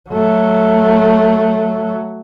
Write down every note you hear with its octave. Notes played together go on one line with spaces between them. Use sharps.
F#3 A3